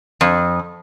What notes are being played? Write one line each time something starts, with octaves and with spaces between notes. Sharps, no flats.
F2